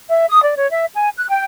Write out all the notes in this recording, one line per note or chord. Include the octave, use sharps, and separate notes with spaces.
E5
D#6
D5
C#5
E5
G#5
F#6
G5